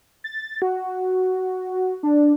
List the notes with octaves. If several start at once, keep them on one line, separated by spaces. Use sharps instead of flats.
A6
F#4
D4